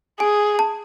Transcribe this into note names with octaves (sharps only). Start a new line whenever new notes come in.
G#4 G#5
A5